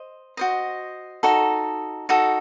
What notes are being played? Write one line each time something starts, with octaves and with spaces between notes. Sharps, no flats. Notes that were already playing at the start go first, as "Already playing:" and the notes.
Already playing: C5 D#5
F#4 C5 D#5
D#4 F#4 A4
D#4 F#4 A4